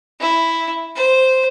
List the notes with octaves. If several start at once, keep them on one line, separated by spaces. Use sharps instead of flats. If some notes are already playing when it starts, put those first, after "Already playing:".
E4
C5